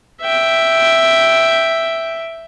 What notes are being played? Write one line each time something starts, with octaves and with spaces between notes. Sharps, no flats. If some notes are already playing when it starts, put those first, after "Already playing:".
E5 G5